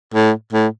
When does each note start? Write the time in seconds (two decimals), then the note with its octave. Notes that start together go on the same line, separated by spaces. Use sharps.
0.14 A2
0.52 A2